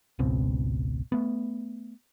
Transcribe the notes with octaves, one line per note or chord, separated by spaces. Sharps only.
G#1 C#2 B2 C4
A3 B3